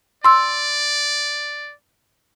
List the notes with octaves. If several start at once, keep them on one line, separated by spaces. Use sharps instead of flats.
D5 C6 E6